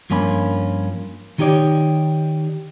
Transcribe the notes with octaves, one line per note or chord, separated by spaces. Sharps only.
G2 F3 A#3 C#4 A#5 B5
D#3 D#4 G4 C#5 D5